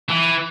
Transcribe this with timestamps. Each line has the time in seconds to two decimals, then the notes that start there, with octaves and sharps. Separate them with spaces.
0.09 E3